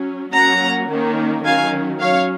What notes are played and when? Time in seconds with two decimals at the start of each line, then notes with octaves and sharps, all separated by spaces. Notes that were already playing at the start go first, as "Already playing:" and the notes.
Already playing: F#3 C#4
0.32 F#3 A#3 C#4 F#5 A#5
0.89 D#3 A#3 C#4
1.44 D#3 F#3 C#4 F5 G#5
2.00 F#3 C#4 C#5 F5